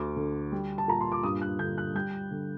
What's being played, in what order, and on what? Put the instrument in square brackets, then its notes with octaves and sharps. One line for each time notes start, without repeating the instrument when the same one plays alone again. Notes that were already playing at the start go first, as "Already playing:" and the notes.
Already playing: [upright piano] D2 D6
D3
G3
A5
A#2 A#5
C6
D6
G2 D#6
F#6
D3 G6
F#6
G3 G6
D3